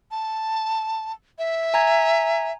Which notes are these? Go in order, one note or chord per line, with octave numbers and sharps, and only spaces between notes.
A5
E5
G#5 A#5 G#6